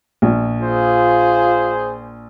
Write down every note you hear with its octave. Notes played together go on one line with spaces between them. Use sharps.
A#1
F4 G#4 C5